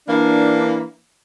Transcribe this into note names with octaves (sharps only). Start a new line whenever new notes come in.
E3 A#3 D4